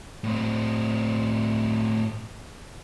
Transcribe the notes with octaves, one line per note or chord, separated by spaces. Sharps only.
A2 C4